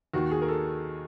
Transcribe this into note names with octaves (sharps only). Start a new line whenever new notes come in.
D#2 D#3 F#4
G#4
A#4
A4